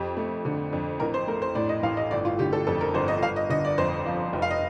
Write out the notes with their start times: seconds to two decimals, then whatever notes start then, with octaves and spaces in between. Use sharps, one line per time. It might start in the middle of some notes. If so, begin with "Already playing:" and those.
Already playing: F2 G4
0.17 A3
0.45 D3
0.73 F2
1.00 A1 A#4
1.14 C5
1.27 A3 A#4
1.42 C5
1.55 A2 D5
1.69 D#5
1.83 A1 F5
1.97 D#5
2.11 G1 D5
2.25 F4
2.39 D3 G4
2.53 A4
2.67 F2 A4
2.81 A#4
2.94 G1 C5
3.08 D#5
3.22 G1 F5
3.36 D#5
3.50 D3 D#5
3.65 D5
3.78 F2 C5
4.06 F3
4.33 F1
4.42 F5
4.51 D#5